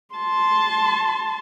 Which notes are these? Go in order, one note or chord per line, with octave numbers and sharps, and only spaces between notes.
A5 C6